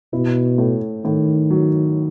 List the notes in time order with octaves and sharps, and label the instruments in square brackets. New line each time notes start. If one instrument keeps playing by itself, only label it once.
[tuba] B2 [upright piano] E4
[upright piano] A2
[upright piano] A2 [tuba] D#3
[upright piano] F#3